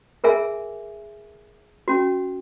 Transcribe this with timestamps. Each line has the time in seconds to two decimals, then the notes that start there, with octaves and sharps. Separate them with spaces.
0.24 G#4 A#4 E5 G#5
1.88 C#4 F#4